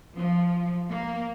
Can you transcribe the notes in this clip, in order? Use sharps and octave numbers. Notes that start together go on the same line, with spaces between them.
F3
A#3